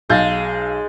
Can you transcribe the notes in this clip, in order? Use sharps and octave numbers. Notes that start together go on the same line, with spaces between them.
B1 G#3 F5 G6 A6